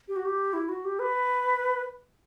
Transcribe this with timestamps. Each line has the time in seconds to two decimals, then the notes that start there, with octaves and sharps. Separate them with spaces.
0.08 G4
0.16 F#4
0.25 G4
0.53 E4
0.69 F#4
0.85 G4
0.99 B4